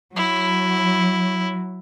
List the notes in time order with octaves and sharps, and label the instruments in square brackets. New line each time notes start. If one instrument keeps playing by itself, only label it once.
[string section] F#3 [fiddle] E4